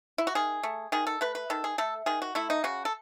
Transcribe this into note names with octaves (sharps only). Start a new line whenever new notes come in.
E4
F#4
D#3 G#4
A3
D#3 G#4
A4
A3 B4
B4
D#3 A4
G#4
A3 A4
D#3 G#4
F#4
A3 E4
D#4
C#3 F#4
A4